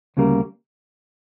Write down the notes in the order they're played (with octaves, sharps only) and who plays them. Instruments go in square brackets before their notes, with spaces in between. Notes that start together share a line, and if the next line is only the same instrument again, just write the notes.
[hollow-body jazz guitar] D2 C#3 G3 A#3